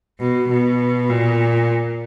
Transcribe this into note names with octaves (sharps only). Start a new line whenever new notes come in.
B2
B2
A#2